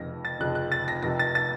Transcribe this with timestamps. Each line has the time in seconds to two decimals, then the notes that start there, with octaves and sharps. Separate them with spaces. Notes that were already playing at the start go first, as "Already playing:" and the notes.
Already playing: F1 F2 C#3 F3 A#6
0.25 A6
0.39 F1 F2 C#3 F3 F#6
0.55 F#6
0.72 A6
0.88 A#6
1.03 F1 F2 C3 A#6
1.19 A6
1.35 A6